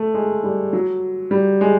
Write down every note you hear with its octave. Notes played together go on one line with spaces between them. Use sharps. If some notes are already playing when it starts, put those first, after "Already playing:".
Already playing: A3
G#3
G3
F#3
G3
G#3